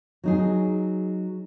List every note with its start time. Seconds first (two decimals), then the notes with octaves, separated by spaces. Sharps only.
0.24 F#3 D#4 G#4